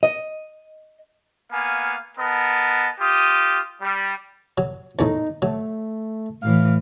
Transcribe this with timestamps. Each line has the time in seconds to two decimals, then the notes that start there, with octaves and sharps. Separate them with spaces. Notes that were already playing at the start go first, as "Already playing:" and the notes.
0.03 D#5
1.51 A#3 B3 F5 G#5
2.18 B3 A#4 D#5 A5
3.00 F4 G4 D#6
3.81 G3
4.58 F#3
4.99 E2 A2 D#4
5.42 F#3 A3
6.42 A2 E3 F5